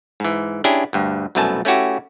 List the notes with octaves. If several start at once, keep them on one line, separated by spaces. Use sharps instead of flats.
G#2 E3
C#4 D4 E4 G4 G#4
D2 G2
C2 F#2 B2 A3 G#5 A5
A3 C#4 E4 F#4 G4